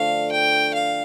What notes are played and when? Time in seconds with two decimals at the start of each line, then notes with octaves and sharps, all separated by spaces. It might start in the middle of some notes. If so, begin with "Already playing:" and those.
Already playing: D3 F3 A3 F5
0.32 G5
0.74 F5